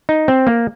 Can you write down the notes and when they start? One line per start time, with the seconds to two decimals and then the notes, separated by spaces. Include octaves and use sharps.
0.09 D#4
0.28 C4
0.47 A#3